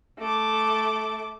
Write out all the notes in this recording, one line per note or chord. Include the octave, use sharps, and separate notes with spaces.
A3 D6